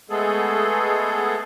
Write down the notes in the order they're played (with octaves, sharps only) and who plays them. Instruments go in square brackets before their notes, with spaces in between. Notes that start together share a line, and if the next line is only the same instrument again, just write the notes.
[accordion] G#3 A3 B3 G#4 A4